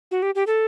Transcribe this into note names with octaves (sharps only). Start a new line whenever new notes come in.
F#4
G4
G4
A4